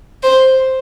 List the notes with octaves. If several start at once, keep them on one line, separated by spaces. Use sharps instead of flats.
C5